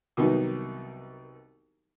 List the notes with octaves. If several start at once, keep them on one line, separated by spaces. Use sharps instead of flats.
C2 D#3 F#3 B3 D#4